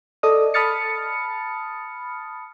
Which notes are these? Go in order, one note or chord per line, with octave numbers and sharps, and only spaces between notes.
A4 D5 D#5 D#6
A5 B5 D#6 F6 A6 C#7